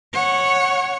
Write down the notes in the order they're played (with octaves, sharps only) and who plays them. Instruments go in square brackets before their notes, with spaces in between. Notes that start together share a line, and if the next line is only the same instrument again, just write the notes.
[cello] C#5 F#5